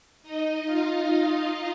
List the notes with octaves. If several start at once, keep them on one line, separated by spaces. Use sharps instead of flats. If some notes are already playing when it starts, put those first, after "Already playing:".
D#4 D#5
F4 F5